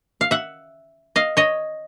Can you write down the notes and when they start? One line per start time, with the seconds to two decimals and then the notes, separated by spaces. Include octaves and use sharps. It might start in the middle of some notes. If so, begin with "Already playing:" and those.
0.21 F5
0.31 E5 F#5
1.16 D#5 F5
1.37 C#5 D#5